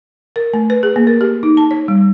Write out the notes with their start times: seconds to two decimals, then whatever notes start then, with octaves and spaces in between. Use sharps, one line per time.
0.36 A#4
0.54 A3
0.70 B4
0.83 G#4
0.96 A#3
1.07 A#4
1.21 G4
1.43 D#4
1.57 A5
1.71 C#5
1.88 G3